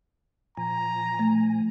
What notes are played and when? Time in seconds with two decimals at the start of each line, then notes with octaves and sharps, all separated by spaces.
0.57 A#2 F3 G#5 A#5
1.19 A3